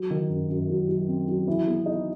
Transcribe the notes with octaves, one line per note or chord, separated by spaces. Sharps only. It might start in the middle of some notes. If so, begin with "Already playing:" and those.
Already playing: F#3
D#3
F#2
F#2
F#3
F#3
C4
F#3
E3
B3
D#4